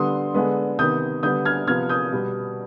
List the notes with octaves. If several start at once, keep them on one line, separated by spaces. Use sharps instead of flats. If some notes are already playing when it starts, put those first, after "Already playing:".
Already playing: D3 G3 B3 C6 D#6
D3 G#3 B3
C3 D#3 B3 D#6 G6
D3 G3 B3 D#6 G6
F6 G#6
C3 F3 B3 F6 G#6
D#6 G6
B2 G3 B3